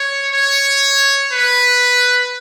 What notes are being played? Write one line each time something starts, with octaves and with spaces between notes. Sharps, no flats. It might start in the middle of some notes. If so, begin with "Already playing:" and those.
Already playing: C#5
C#5
B4